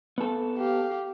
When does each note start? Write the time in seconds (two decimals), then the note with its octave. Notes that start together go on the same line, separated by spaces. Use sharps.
0.18 B3 A4
0.57 G4 F5